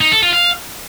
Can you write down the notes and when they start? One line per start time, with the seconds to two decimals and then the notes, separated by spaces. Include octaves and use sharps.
0.01 D#4
0.12 A4
0.22 F4
0.33 F5